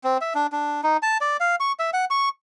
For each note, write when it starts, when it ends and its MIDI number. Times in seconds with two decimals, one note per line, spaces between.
0.04 0.17 60
0.21 0.33 76
0.35 0.47 62
0.52 0.81 62
0.83 0.97 63
1.03 1.18 81
1.21 1.37 74
1.40 1.56 77
1.60 1.72 85
1.79 1.90 76
1.93 2.05 78
2.11 2.29 85